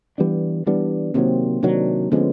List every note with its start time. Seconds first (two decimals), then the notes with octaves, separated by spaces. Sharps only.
0.18 E3 G3 B3 D4
0.67 E3 G3 B3 D4
1.14 C3 D#3 F#3 A#3 C4
1.63 C3 D#3 F#3 C4 D4
2.12 D3 F3 G#3 B3 C#4